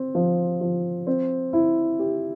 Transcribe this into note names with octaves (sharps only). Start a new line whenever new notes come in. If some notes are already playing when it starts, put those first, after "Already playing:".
Already playing: C4
F3
F3
C4
E4
G4